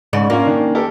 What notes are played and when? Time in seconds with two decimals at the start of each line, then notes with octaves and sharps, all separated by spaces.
0.13 G#2 C#3 D5
0.30 A#3 C#4 D4 F4
0.47 D#3 C#4 D4
0.75 G4 A4 A#4